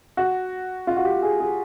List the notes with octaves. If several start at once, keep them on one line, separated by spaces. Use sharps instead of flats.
F#4
F4
F#4
G4
G#4
G#4